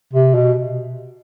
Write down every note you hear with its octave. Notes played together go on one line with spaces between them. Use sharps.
C3
B2